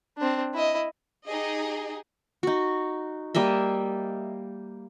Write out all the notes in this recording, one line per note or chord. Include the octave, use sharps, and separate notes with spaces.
C4 D4
E4 D#5
D#4 G4 G#4 D#5
D#4 F#4
G3 A#3 D#5 E5